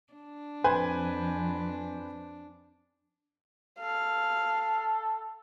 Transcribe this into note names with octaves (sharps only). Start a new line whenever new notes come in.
D4
F2 B4 C5 G#5
A4 F5